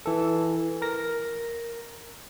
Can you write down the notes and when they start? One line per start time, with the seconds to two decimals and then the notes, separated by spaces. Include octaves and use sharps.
0.06 E3 A4
0.82 A#4 A#6